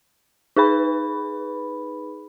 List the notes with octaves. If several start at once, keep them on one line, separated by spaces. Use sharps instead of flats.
D#4 G#4 B4 B5